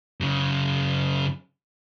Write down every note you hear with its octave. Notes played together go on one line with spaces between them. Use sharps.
F#2 C#3